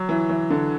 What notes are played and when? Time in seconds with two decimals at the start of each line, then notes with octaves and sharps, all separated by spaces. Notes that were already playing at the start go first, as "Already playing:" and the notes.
Already playing: F#3
0.09 E3
0.29 E3
0.50 D3